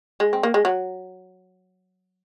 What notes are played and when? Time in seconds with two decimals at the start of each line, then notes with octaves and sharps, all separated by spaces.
0.20 G#3
0.33 C4
0.43 A#3
0.54 G#3
0.65 F#3